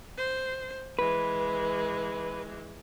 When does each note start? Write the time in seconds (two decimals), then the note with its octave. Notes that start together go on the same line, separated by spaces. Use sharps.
0.17 C5
0.99 E3 G#3 B4